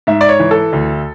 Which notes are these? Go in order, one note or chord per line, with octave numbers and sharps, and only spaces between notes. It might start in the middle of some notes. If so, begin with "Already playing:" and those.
G#2 E5
D5
C#5
E3
A4
D2